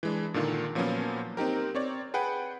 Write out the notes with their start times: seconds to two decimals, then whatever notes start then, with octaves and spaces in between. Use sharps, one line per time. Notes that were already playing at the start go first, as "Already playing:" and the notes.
0.03 E3 G#3 D4
0.34 A#2 D3 D#3 F4
0.75 A#2 F3 F#3 A#3 B3 C#4
1.37 C4 D#4 G4 A#4
1.75 C4 C#5 D5
2.14 G#4 B4 F#5 G5